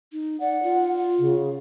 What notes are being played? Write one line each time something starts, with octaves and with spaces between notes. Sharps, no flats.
D#4
D5 F#5
F4
C#3